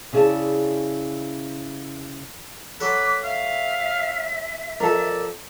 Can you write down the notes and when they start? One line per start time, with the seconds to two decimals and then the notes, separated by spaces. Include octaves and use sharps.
0.13 C#3 E4 G#4 A4 D5 A5
2.81 F#3 A4 B4 D6
3.23 E5 F5
4.80 F2 A4 A#4 D5